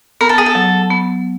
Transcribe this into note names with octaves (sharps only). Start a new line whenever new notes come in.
B3 A#4
A4
G#4
A4
F#3
B3